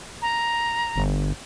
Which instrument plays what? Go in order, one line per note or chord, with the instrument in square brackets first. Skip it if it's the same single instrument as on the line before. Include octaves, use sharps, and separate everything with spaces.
[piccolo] A#5
[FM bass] G1